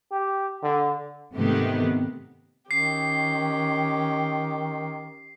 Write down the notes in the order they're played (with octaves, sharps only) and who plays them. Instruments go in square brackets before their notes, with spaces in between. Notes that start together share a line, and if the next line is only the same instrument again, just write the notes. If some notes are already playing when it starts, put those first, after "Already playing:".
[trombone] G4
D3
[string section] G#2 C3 D#3 A3 B3 G4
[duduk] D#3 [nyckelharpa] C#4 G4 [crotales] C7